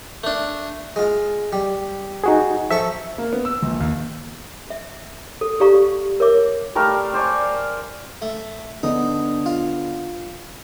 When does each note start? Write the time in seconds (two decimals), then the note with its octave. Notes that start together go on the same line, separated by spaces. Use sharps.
0.24 A3 D4
0.96 G#3 F4
1.53 G3
2.24 D#4 F#4 G#4
2.71 F3 A4 E5 C#6
3.18 A#3
3.33 B3
3.45 E6
3.63 A#1
3.80 D#2
4.70 E5
5.41 A4
5.60 G4 A4 D5 F5 A#5 C#6
6.20 A#4 C#5 E5 D6
6.75 G3 A3 A#4 F5
7.14 C5 D5 G#5 C#6
8.22 A3
8.83 D3 B3 D4 D#4
9.46 F4